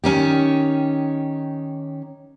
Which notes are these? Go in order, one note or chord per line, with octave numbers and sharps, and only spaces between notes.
D#3 C#4 D#4 G4